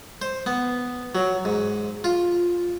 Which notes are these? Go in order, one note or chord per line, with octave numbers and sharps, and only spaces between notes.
C5
B3
F#3
G#2
F4